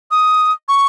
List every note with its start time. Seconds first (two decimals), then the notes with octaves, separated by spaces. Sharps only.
0.11 D#6
0.69 C#6